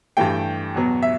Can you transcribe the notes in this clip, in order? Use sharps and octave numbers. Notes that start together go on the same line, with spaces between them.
G2 E3 A3 G5
E2 B2 F#3 B3
E5